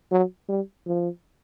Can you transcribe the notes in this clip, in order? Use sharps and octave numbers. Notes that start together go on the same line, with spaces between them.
F#3
G3
F3